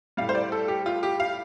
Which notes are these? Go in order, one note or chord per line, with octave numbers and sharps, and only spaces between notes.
A2 G3 F5
C5
D5
A4
G4
F4
G4
F5